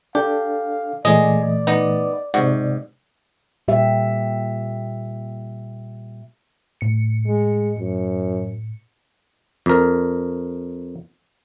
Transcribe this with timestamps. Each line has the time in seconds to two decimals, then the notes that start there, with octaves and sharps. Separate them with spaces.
0.15 D4 G4 A4 F5
1.05 A#2 E3 G#3 A3 G#4 D5 D#5
1.67 B3 D#4
2.34 G#2 C3 F#4 D5
3.68 A#2 G3 G4 E5
6.81 A2 C#7
7.27 G#3
7.79 F#2
9.66 F2 A#4